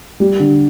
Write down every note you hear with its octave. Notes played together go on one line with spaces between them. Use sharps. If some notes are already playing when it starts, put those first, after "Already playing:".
G3
D3